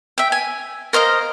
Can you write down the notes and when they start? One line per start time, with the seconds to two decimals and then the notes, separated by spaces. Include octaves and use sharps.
0.18 E5 G5
0.32 G#5
0.93 A#4 C5 D#5 F5